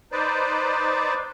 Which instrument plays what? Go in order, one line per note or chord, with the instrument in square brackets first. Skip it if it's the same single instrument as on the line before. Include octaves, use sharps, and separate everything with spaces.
[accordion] D#4 B4 C5 D5